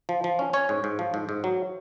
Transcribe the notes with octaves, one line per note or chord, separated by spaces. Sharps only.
F3
F3
C#4
C#4 C#5
G#2
G#2
F3
G#2
G#2
F#3